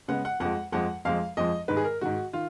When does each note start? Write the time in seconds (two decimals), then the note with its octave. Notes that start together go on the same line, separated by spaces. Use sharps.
0.08 C#3 G#3 B3 F#5
0.25 F#5
0.40 F2 F3 G#3 F#5
0.72 F2 F3 G#3 F#5
1.05 F2 F3 G#3 F5
1.37 F2 F3 G#3 D#5
1.68 G#2 D#3 G#3 B4
1.77 G#4
1.84 A#4
2.01 G#2 D#3 G#3 F#4
2.33 D#3 F4